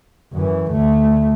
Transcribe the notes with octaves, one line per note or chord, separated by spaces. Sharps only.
F#2 E3
D2 A3